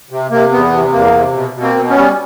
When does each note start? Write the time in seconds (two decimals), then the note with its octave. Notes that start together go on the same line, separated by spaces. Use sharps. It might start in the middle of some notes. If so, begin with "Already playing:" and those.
0.11 C3
0.31 C3 A#3
0.52 E2 B3
0.72 C3
0.93 E2 A#3
1.14 C3
1.34 B2
1.55 B2
1.62 A#3 C4
1.75 B2
1.90 B3 C#4
1.96 G3